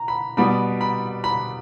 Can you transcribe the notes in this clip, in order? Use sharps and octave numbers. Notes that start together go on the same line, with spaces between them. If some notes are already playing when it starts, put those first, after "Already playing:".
Already playing: A#5
B5
B2 G3 B3 B5
B5
B5